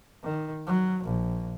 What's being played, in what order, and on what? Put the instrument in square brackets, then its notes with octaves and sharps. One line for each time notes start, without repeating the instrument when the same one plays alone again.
[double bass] D#3
F#3
A#1